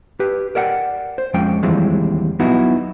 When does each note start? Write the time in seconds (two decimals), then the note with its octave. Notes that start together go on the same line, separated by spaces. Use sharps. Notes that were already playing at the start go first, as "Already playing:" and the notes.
0.20 G4 B4
0.55 A#4 D5 E5 F#5 G5
1.18 C5
1.34 F2 F3 G#3 C#4 G5
1.63 D#2 E3 F3 G3 G#3 C4
2.39 F#3 B3 D#4 E4 F#4